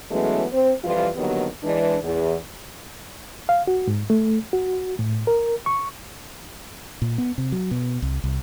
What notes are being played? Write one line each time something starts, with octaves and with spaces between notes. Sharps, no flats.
E3 F#3 G#3 A3 B3 C#4
C4 C5
F2 E3 G3 F4
D3 D#3 F#3 G3 A#3 B3
E3 G#3 D4
E2
F5
F#4
G#2
A3
F#4
A2
A#4
C#6
A#2
B3
C3
F#3
B2
C2
C2